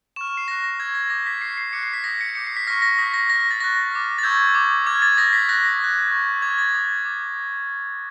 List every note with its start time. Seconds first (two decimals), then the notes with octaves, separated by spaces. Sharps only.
0.16 C#6 F6 E7
0.27 E7
0.37 C7
0.48 C#6 F#6 A#6
0.64 A#6
0.79 C#6 E6 G6 G#6
0.95 A#6
1.10 D6 G6 A#6
1.26 B6
1.41 C#6 F6 C7
1.58 C7
1.73 D6 F#6 C#7
1.83 C7
1.93 B6
2.04 D#6 G6 A#6
2.21 C#7
2.35 D6 G6 C#7
2.47 C7
2.57 B6
2.67 C#6 F6 A#6
2.82 A#6
2.98 D#6 G6 B6
3.14 A#6
3.29 C#6 F6 A#6
3.40 A#6
3.51 A6
3.60 C#6 F#6 A#6
3.92 D6 F6
4.18 A6
4.23 C#6 E6 G6 G#6
4.55 D6 G6
4.86 D6 F6 G#6
5.02 A6
5.17 D#6 G6 A#6
5.33 B6
5.49 D#6 F#6 A#6
5.80 C#6 F#6
6.11 C#6 E6 G6
6.42 D6 F6 G#6
6.58 A6
6.74 D#6 G6
7.05 D6 G6